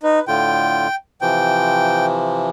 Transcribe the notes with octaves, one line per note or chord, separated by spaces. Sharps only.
D#4 B4
A2 D3 F4 G5
C3 E3 F3 G5